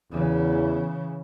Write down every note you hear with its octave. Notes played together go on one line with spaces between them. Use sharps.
E2 C#3 E3